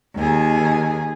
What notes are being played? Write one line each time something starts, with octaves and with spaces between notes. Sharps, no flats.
D#2 G#4